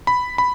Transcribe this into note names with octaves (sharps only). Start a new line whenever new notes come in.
B5
B5